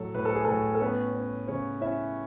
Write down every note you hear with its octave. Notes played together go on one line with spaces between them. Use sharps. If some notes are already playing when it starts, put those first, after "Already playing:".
Already playing: A2 F#3 A4
A2 B4
A4
G#4
A2 A4
A4
B3 C#4 B4
C#4
C#3 C#4 C#5
C#4 E4 E5